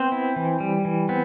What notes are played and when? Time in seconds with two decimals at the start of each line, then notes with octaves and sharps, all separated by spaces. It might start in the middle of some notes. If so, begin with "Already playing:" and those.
Already playing: B3 C4 C5
0.12 E4
0.36 E3
0.60 G3
0.85 E3
1.09 B3 C4